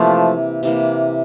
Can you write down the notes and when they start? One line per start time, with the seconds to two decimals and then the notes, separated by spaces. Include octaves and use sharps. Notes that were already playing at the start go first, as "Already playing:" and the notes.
Already playing: C3 E3 F3 A3 A#3
0.63 C3 E3 A#3